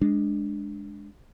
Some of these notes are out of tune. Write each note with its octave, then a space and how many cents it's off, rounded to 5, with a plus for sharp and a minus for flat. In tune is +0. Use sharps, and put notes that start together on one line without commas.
G#3 +0 D4 +0